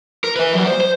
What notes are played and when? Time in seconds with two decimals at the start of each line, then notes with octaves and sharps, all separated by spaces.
0.24 A#4
0.36 B4 E5
0.53 F#3 G3
0.67 C5
0.81 C5